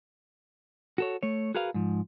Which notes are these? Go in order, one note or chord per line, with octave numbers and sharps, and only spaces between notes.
F#4 A4 C#5
A3 C#5
F#4 G#4 A#4 B4 F5
G#2 F3